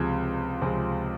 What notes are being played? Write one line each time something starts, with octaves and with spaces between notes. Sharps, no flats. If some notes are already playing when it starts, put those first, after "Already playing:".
Already playing: C#2 C3 F3 G#3 C4 G#6
C#2 C3 F3 G#3 C4